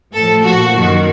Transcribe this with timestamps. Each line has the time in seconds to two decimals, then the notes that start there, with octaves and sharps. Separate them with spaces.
0.13 A2 F3 A4
0.43 A#2 F3 F#4
0.73 F#2 D#3 F#3